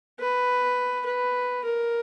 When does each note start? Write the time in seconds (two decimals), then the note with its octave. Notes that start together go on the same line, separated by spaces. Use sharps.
0.20 B4
1.06 B4
1.65 A#4